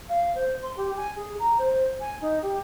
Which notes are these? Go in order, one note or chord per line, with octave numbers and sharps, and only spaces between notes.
F5
C5
C6
G4
G#5
G#4
A#5
C5
G#5
D#4
G4